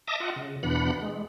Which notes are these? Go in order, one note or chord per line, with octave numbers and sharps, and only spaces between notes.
D#5 E5 A5 D6 D#6 A#6
F4 D#5 F#5
C#3
E2 B2 E3 D4 F#5 B5
G#3